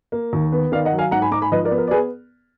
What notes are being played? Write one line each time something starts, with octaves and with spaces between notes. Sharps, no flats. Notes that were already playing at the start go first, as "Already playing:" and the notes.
A#3
D#2
B3
D#3 D5 F5
D#5 F#5
F#3
F5 G#5
G#2 F#5 A#5
G#5 B5
G#2 A#5 D6
G#5 B5
F3 B4 D#5
A#4 D5
B3
A#4
D5
G#4 B4